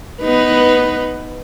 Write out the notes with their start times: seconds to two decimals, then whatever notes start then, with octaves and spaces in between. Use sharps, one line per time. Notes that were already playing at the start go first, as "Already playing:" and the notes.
0.22 B3 D#4 B4